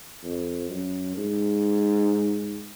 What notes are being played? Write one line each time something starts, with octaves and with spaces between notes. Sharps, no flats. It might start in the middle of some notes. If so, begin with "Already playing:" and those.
F2
F#2
G#2